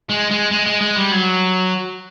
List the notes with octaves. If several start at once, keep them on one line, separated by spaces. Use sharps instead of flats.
G#3
G#3
G#3
G#3
G#3
G3
F#3